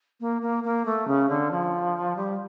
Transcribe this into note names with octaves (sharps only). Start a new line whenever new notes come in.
A#3
A#3
A#3
A3
C#3
D3
F3
G3